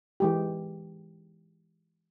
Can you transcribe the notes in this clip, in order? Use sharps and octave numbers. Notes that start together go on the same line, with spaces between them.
E3 G#3 G4